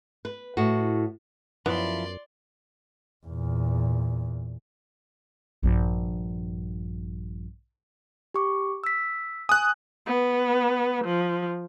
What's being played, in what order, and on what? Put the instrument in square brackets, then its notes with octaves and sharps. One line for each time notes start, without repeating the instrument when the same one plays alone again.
[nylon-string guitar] B4
A2 F#4
[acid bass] F#2 [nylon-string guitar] F3 E4 [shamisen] B3 [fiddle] D5 C6
[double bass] E2 A#2
[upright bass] A#1 G2
[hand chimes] G4 C#6 D6
E6 B6
[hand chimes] G#5 [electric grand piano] D#6 F#6
[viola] B3
F3